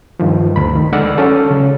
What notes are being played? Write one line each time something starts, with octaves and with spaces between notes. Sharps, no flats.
G2 D#3 F3
D2 B5
D#3
D3 G#3 D5 F#5 E6 F6
F#3 C#4 A4
C#3